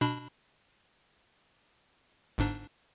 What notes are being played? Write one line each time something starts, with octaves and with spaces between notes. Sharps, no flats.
B2 D4 B5
G1 G#2 D4